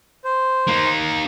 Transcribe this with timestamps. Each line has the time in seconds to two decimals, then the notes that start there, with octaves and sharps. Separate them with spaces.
0.24 C5
0.68 A#3 D#4